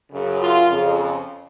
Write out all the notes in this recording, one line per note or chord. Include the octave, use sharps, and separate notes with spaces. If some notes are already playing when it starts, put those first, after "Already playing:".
F#2 C#3
F4
F2 C#3